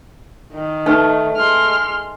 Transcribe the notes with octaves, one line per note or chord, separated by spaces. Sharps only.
D#3
A3 D#4 B4 C#6
G#3 C6 F6